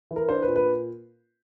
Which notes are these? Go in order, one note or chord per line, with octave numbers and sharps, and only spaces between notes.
E3
A#4
D4 C5
B4
A#2
B4